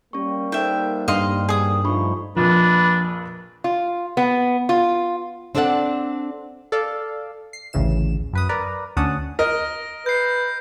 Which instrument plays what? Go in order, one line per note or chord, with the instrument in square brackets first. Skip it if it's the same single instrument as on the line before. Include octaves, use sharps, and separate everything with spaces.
[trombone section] G3 A#3 [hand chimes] C#4 C#6
[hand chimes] D#4 A4 C5 [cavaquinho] E5 G5
[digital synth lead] G2 [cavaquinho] D#5 F5 C6
[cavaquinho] G#4 D#6
[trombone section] F3 A3 D#4 [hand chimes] D4 B5 C#6
[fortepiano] A#1 F2 F4 [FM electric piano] F3 [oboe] D4 [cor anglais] B4
[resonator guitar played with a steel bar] F4
B3
F4
[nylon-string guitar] C4 D4 A4 D5 E5 F#5
[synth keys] A4 D5 F5
C7
A1 D2 C#3 E3 E7
F#2 B4 D#6
A#4 B4 D5 A#5
D2 C#4 D4 F#5 A5 D#6
[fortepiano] A#4 D#5 [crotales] A#6
[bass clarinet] B4 [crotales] G6 C7